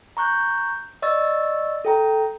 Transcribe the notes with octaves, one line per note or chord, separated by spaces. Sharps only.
A#5 C#6 F#6 G6
D5 D#5 C#6 E6 A6
A4 G5 A#5